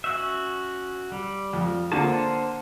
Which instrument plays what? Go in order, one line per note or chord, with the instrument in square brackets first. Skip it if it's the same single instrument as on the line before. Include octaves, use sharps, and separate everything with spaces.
[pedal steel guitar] C#4 F#4 E5
G3
[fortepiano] F2
[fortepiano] D3 A#3 [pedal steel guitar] C5 A5